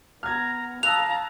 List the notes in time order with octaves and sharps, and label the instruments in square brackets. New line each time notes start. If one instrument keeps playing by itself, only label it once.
[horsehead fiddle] B3 [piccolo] A#5 [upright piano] F6 G#6
[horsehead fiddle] F5 A5 [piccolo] A#5 [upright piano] D#6 E6 F#6 [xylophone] F7